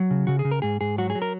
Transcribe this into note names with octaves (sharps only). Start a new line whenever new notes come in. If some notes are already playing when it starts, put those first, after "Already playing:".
Already playing: F#3
C#3
C#3 F#4
G#4
C#3
A#4
G#2 G#4
G#2 G#4
F#3 F#4
G#4
F#3
A#4